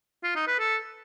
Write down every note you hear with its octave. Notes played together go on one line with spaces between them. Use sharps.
F4
D#4
B4
A4